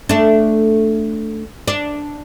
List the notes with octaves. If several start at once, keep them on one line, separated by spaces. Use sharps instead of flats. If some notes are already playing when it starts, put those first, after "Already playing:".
A3 D4
D4